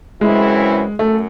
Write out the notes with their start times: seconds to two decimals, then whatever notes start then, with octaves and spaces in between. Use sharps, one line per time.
0.21 F#2 C#3 E3 G#3 C4 E4
0.99 F#2 A3